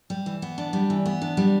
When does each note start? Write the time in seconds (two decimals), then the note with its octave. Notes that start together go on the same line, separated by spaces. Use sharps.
0.10 G3
0.26 E3
0.42 B3
0.58 D4
0.73 G3
0.90 E3
1.06 B3
1.22 D4
1.37 G3